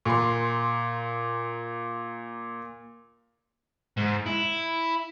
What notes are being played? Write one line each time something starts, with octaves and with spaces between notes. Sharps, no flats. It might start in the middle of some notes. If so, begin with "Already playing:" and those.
A#2 C6
G#2
E4